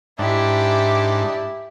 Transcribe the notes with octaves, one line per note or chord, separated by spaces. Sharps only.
G#2 D4 E4 G4